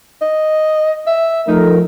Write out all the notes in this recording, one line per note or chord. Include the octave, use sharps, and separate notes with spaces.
D#5
E5
F3 A3 D#4 A#4